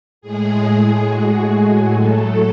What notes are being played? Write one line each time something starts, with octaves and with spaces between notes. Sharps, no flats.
A2 G#3 G#4
F#4
A2 F#3 A3 A4